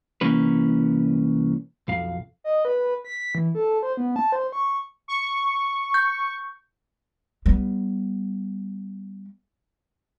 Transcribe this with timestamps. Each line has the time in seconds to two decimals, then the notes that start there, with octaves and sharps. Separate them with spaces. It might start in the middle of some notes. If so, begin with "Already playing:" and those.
0.21 C2 E3 A#3 C#4 B4
1.88 B1 F2 F5
2.44 D#5
2.65 B4
3.04 B6
3.35 E3
3.55 A4
3.83 C5
3.97 B3
4.16 A5
4.32 C5
4.53 C#6
5.08 C#6
5.94 G6
7.46 G3 B3